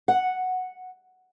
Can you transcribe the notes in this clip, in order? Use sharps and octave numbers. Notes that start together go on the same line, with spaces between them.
F#5